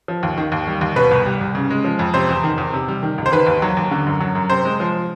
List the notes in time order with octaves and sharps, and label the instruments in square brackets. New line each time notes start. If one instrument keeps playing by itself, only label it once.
[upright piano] F3
D#2
D#3
D#2
G3
D#2
B2 B4
C2
G3
C2
C#3
G#3
F3
F2
C3 C5
E2
D#3
E2
C3
G3
D#3
C#2
C5
D#3 B4
D#2
F#3
D#2
D3
F#2
F#3
F#2
C3 C5
G#3
F3